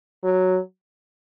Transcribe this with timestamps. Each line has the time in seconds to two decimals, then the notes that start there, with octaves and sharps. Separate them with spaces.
0.24 F#3